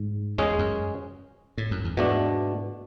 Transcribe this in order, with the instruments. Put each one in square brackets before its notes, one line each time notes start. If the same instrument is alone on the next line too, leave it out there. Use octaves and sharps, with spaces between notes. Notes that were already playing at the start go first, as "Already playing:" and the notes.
Already playing: [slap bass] G#2
[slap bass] E2 [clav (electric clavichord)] G#3 C#4 G#4
[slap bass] F#2
A2
F#2
E2
[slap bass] G#2 [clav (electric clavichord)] B2 A3 D4